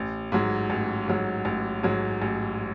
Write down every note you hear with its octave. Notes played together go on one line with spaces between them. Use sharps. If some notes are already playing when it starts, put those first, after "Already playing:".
Already playing: A1
G#2 F#3
A1
G#2 F#3
A1
G#2 F#3
A1